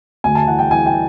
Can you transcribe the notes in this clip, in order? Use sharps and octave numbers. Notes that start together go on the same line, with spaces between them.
D2 G#5
A5
E3 F#5
G5
E3 G#5
G5